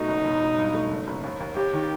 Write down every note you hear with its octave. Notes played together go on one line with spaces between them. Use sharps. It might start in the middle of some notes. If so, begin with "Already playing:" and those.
Already playing: B2 A3 D#4
F#1
E1
E1
G2
A3
F#1
F#1
D#2
D#2
D#2 G4
D#3